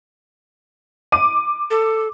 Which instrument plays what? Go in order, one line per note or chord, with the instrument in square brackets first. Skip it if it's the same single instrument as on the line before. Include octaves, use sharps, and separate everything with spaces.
[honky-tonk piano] D6 D#7
[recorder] A4